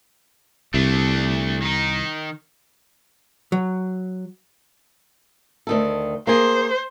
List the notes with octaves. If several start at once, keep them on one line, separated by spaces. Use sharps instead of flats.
C2 A3 D4
D#3 D#4
F#3
D2 D#3 A4
A#3 G#4 C5